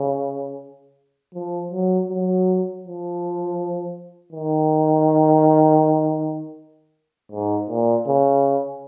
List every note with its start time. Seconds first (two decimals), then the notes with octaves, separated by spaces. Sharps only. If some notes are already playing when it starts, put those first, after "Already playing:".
Already playing: C#3
1.34 F3
1.72 F#3
2.09 F#3
2.84 F3
4.32 D#3
7.32 G#2
7.69 A#2
8.07 C#3